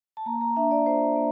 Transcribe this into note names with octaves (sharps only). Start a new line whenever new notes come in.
A5
A#3 A#5
A#5
D4 E5
D5
F4 C5
A#3